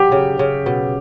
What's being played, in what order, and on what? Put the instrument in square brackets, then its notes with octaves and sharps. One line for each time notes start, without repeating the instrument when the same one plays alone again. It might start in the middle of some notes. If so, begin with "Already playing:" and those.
Already playing: [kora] F#3 [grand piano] G4
[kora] C#3
C#3
B2